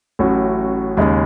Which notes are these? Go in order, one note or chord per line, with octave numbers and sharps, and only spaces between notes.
A1 A2 F#3 C#4 F#4
D#2 C#3 G#3 D#4